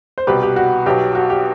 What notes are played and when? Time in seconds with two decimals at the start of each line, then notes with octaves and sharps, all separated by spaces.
0.18 C5
0.27 C2 B2 G3 G4 B4
0.43 G4
0.56 F#4
0.86 B1 B2 F#3 G4
1.15 F#4
1.30 G4